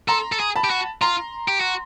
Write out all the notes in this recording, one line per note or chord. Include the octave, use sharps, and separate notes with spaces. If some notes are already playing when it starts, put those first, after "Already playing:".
A4 A#5 C6
A4
G#4
A5 B5
G4
F#4
F4 A#5 C6
G4
F#4